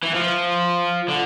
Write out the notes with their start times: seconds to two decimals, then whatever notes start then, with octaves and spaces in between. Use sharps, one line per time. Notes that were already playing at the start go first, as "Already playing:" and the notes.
0.03 E3
0.15 F3
1.08 D3